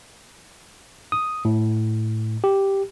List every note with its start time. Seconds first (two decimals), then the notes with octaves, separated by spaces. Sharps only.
1.12 D#6
1.45 A2
2.44 G4